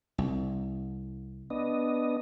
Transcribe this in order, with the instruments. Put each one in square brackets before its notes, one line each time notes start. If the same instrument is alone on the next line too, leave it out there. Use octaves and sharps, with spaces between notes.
[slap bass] C2
[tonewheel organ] B3 D4 D#5